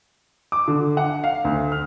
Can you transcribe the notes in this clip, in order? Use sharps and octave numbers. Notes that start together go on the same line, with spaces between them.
D6
D3
F#5
F5
D2
F6